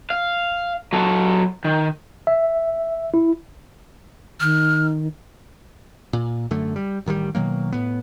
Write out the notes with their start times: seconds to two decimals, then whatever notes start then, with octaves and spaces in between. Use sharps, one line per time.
0.10 F5
0.93 F#3 A4
1.65 D#3
2.27 E5
3.14 E4
4.40 D#3 F6
6.13 A#2
6.51 F#2 D3 A3
6.76 G3
7.06 A1 D#3 E3 G3
7.35 B2 D#3 F#3 A#3
7.73 A2 B3